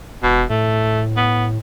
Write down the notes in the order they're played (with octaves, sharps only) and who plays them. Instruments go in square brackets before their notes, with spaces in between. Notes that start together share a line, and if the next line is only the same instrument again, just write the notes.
[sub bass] E1 [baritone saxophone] B2
[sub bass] A2 [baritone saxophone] A3
[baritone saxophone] B3